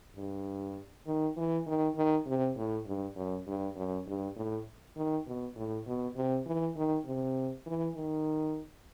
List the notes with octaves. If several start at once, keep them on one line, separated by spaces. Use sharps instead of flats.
G2
D#3
E3
D#3
D#3
C3
A2
G2
F#2
G2
F#2
G2
A2
D#3
B2
A2
B2
C3
E3
D#3
C3
E3
D#3